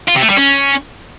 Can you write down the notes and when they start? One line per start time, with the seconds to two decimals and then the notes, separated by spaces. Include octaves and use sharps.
0.08 F4
0.15 C3
0.22 A3
0.29 G3
0.37 C#4